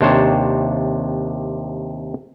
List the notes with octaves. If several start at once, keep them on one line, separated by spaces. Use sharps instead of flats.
D#2 C3 D4 C5 C#5 A5